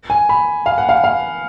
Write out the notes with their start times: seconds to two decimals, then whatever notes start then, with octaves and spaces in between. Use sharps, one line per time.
0.10 G#5
0.29 B5
0.66 F5
0.78 F#5
0.89 F5
1.04 F5